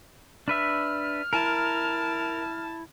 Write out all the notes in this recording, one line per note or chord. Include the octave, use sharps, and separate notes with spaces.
D4 B4 E5 F6
E4 A#4 A5